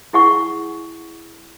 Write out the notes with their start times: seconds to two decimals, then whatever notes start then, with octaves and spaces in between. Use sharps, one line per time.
0.13 E4 G#4 F#5 G#5 C#6